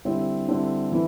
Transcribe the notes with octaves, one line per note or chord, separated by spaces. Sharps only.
D3 G3 C4 E4
D3 G3 C4 E4
E3